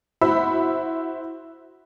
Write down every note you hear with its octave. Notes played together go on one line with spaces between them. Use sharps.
E4 F#4 C5 E5 B5 E6